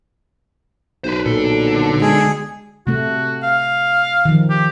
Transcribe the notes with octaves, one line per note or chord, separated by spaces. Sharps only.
B1 B4 C5
A#2 D3 A4
G#3 G#4
C3 A3 F#4
F5
D#3 F3
G4